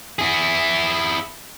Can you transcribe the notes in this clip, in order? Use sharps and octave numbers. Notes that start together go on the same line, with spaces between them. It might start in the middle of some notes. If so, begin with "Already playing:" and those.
E4 G#4